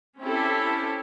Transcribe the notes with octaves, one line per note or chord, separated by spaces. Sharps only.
C4 C#4 E4 G4 A4